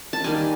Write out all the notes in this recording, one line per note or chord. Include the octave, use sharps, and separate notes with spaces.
A5
D#3 G3 A#3 G#5